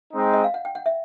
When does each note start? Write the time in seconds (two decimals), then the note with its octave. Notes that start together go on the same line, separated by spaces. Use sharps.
0.13 G#3 C4 D#4
0.33 D#5
0.44 F5
0.54 F#5
0.65 G5
0.75 F#5
0.86 E5